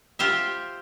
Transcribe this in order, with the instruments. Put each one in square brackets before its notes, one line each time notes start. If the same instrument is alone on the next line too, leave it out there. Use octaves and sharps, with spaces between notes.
[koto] F4 G4 C5 E5